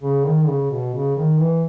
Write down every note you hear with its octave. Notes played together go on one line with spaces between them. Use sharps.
C#3
D#3
C#3
B2
C#3
D#3
E3